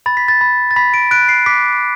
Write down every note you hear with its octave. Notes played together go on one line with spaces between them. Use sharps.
B5 A6
B6
A6
B5
A6
B5 B6
D7
F#6 D7
C7
D6 B6